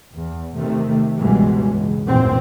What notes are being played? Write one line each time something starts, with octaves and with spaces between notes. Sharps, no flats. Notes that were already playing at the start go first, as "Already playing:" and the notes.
E2
C3 D#3 A3
C#2 G2 B2 E3 G3 G#3
C#2
F1 A#1 G#2 B2 E3 C4